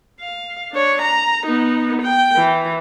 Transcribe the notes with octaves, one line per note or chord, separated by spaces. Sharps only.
F5
D4 C#5
A#5
B3 D#4
G5
E3